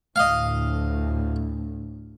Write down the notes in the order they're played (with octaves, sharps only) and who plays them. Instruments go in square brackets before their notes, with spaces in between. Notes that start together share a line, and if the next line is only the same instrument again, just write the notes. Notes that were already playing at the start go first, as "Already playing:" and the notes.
[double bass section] D2 A2 [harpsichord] D#5 F5